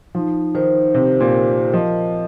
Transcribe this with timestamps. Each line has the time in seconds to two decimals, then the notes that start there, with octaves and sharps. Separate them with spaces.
0.15 F3 D#4
0.55 D#3 C5
0.94 C3 G4
1.20 A#2
1.34 A#4
1.73 F3 D#5